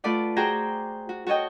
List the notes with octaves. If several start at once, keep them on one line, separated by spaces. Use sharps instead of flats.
A3 F4 A4 B4 D5 F#5
F#4 G#4 C5 G5 A#5
F#4
F#4 A4 C#5 D#5 G5